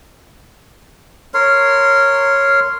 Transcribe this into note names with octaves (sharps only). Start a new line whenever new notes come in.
A#4 C#5 C6